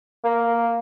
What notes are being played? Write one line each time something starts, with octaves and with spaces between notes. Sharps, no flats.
A#3